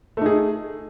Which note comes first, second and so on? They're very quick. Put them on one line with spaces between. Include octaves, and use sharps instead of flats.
A3 D#4 G#4